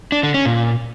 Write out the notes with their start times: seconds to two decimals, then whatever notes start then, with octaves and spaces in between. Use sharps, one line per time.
0.12 D4
0.23 D3
0.34 C#4
0.45 A#2